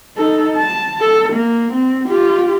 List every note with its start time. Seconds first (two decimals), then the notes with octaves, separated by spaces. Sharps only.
0.17 D#4 A4
0.56 A5
1.01 A4
1.33 A#3
1.73 C4
2.08 F4 G4